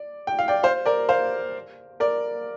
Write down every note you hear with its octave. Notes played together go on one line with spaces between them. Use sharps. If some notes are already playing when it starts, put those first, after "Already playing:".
Already playing: D5
G5
F5
D5 G5
C5 F5
A#4 D5
C5 F5
A#4 D5